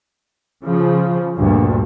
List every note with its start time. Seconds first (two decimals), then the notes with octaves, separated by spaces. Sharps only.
0.64 C#3 F3
1.38 D2 G2 A#2